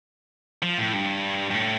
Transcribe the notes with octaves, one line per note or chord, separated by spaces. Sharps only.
F3
A2
G2
G2
A2